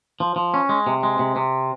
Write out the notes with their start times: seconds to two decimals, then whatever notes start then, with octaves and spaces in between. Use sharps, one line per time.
0.20 F3
0.36 F3
0.54 C#4
0.69 G#3
0.87 C3
1.03 G#3
1.19 C3
1.36 C3